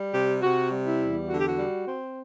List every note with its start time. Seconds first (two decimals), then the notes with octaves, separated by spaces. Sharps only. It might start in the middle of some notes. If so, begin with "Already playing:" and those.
Already playing: G3
0.13 C3 G4
0.42 C3 F#4
0.72 G3
0.86 E4
1.00 E2
1.29 D3 F#4
1.39 G4
1.48 F#4
1.58 G3
1.88 C4